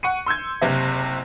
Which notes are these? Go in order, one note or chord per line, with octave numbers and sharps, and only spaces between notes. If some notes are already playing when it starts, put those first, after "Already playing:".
F#5 C#6 C#7 D#7
C6 E6 G6 G#6
F#1 C3 E5